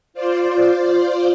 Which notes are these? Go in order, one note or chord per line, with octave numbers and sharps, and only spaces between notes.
F4 C5 D5